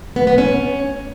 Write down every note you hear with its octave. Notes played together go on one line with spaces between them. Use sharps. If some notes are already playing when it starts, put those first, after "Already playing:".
B3
B3
C#4